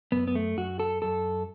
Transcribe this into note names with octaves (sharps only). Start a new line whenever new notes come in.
F#2 B3
B3
A3
F#2 F#4
A4
F#2 A4